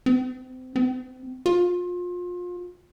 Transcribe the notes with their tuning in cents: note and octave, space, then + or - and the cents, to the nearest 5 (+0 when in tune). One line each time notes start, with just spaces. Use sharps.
C4 -30
C4 -30
F4 +30